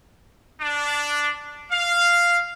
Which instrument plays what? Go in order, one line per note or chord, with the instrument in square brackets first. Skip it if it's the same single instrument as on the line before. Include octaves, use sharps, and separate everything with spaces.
[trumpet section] D4
F5